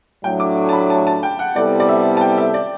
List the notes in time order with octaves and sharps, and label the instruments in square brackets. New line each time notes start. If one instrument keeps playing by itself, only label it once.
[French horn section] A2 F#3 A3 D4 [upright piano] G5
[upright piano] D6
A5
B5
A5
A5
G5
F#5
[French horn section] C3 G3 B3 E4 A4 [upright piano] D5
[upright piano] D5
E5
A5
G5
E5
D5